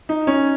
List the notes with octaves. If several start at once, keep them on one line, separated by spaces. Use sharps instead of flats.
D#4
C#4